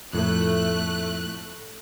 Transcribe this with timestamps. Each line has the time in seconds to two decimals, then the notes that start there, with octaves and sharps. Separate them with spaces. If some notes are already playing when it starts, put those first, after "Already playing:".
0.13 F2 A2 A3 F#6